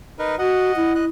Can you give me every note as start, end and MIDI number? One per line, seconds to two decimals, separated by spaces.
0.19 0.36 63
0.19 0.36 70
0.19 0.36 71
0.39 0.72 66
0.39 0.93 75
0.39 0.93 78
0.76 1.09 64
0.95 1.05 75
0.95 1.05 90